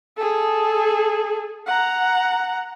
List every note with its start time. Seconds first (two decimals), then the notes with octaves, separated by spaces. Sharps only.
0.17 G#4 A4
1.67 F#5 A#5